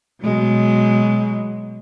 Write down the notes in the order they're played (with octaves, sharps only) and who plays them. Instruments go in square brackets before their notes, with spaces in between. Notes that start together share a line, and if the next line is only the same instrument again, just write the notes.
[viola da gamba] B2 F#3 G#3